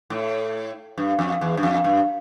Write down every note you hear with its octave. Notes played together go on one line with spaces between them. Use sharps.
A2
G2
F2
E2
G2
F2
G2